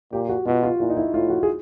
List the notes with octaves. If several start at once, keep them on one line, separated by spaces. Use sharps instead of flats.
A#2 G4
F#4
B2 F4
F4
A#2 E4
D#4
E4
A2 F4
F#4
G#4